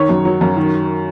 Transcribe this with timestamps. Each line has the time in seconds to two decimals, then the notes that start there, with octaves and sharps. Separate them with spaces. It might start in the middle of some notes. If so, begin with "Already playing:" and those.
Already playing: D#3 C#5
0.09 F#2
0.25 F#3
0.41 F#2
0.56 D#3